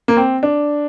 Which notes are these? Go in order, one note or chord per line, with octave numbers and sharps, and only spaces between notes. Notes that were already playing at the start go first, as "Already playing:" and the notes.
A#3
C4
D4